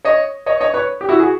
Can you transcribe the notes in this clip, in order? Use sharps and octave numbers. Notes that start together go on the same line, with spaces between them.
C#5 D#5
C#5 D#5
C#5 D#5
B4 C#5
G4
E4 F#4
F#4 G#4